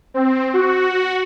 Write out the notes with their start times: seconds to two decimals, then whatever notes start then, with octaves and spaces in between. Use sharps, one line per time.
0.14 C4
0.54 F#4